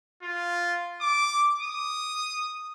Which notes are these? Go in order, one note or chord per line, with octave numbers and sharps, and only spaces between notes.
F4
D6
D#6